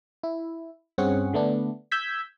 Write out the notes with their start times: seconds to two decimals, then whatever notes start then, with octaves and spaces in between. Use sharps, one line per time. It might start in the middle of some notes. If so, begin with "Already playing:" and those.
0.23 E4
0.98 G2 C4 C#4 G#4 F#5
1.33 D3 A3 B3 D4
1.92 E6 G6 G#6 B6